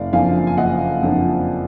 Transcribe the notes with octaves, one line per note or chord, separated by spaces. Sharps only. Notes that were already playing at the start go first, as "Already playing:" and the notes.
Already playing: F#1 D5 F5
F2 F3 A#3 D4 F5 G#5
G#5
F#1 D#5 F#5
F2 F3 A#3 D4